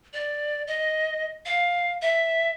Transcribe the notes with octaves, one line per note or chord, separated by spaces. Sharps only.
D5
D#5
F5
E5